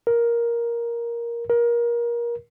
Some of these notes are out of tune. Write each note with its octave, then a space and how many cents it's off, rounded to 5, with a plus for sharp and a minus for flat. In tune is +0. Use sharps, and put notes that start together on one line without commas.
A#4 +10
A#4 +25